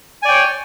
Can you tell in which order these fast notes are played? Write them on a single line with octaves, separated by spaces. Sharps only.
G#5 D5 G5 C#5